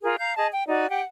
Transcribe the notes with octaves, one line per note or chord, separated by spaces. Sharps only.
F4 G#4 A#4
F5 A#5 G6
G#4 D#5 A5
G5
D#4 F#4 D5
G4 F#5 G5